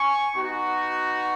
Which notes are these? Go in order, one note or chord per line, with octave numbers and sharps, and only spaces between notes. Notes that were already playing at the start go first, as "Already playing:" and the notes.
Already playing: G#5 C#6
B3 D#4 F#4